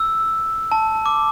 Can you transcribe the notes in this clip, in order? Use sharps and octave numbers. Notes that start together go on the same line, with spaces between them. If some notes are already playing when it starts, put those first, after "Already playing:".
Already playing: E6
A5
D6